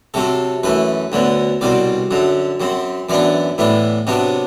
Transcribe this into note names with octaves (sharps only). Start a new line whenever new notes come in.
C3 F#3 C4 A4
F#2 E3 A3 B4
D2 D3 F#3 B3
C2 B2 F#3 C4 D5
F#2 D3 F#3
F#2 F#3 C4
F#2 E3 B3 D4 D5
A2 E3 B3 D4
C3 F#3 B3 D4